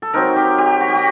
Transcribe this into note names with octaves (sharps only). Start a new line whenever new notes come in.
A4
F#3 C4 D#4 A#4
G4
G4
F#4
G4
F#4